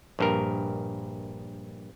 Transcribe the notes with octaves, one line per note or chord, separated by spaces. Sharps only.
A#1 G2 A#4